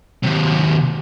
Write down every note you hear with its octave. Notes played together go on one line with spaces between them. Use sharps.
D#2 C3